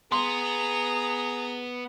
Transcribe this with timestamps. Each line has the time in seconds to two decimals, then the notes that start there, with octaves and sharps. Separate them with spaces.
0.12 B3 G#4 A#5 C6